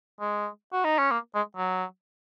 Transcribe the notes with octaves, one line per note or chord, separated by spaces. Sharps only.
G#3
F#4
D#4
C#4
A#3
G#3
F#3